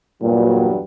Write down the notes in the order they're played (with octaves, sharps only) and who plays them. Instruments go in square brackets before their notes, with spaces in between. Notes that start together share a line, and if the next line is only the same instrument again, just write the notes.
[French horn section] E2 G2 F#3 [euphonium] A#2